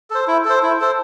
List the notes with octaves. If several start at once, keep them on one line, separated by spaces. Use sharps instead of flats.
A4 C5
E4
A4 C5
E4
A4 C5